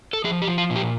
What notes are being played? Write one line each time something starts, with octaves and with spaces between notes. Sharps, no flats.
A4
F3 G#4
G4
F3
F4
A#2
G4